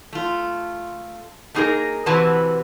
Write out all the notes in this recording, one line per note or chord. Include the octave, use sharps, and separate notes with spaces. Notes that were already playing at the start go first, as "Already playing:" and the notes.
A3 F4
A3 A#3 D#4 F4 G#4 A#4
C3 E3 E4 F#4 B4 A5